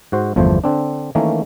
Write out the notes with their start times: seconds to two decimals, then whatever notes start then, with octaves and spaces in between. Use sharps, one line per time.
0.12 G#2 F#4 C5
0.36 G1 E2 F3 A3 C5
0.64 D3 C4 D4
1.15 D#3 E3 A3 A#3 C#4